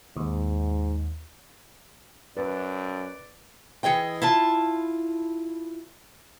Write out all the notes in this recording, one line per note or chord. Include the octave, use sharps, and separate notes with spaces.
D#2 G#2
F#2 B4 D5
E3 G#4 D#5 G5
E4 F4 A5